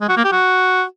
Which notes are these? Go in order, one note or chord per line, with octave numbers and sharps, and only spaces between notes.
G#3
F#4
A#3
G4
F#4